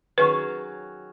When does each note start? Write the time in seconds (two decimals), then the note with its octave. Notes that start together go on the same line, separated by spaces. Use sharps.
0.18 D#3 F#3 C#4 G#4 B4